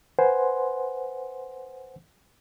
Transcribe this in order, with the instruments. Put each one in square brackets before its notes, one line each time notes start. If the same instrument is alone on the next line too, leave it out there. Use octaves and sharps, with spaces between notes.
[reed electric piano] B4 C5 F#5 G#5 C6